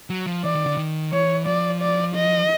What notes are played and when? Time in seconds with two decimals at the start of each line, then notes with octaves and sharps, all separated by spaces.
0.10 F#3
0.26 F3
0.44 E3 D5
0.55 D#3
0.66 D3
0.77 D#3
1.12 E3 C#5
1.46 F3 D5
1.81 D5
2.15 D#5